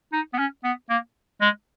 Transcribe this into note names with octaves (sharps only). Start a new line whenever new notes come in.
D#4
B3
C#4
B3
A#3
G#3